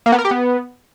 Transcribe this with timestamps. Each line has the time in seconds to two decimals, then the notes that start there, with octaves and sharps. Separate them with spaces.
0.06 A#3
0.12 B3
0.18 A#4
0.25 G4
0.31 B3